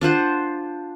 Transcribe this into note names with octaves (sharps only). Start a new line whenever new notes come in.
D4 F4 C5 F#5